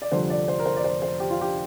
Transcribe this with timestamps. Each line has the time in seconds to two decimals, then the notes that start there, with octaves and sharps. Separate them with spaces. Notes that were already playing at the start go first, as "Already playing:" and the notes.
0.02 D5
0.12 F1 F2 D3 G3 C5
0.30 D5
0.48 C5
0.59 A#4
0.65 C5
0.76 D5
0.84 C5
1.02 C5
1.20 G4
1.30 F4
1.41 G4